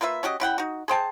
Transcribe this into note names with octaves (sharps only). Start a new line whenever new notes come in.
A#3 F4 B4 E5
C#4 F#4 G4 D#5
C#3 E4 F#5 G5
D#4 F#4
G#4 C5 G5 A5